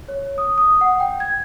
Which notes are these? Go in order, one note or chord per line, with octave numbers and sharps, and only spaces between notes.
C#5
D#6
D#6
F#5
G5
G#6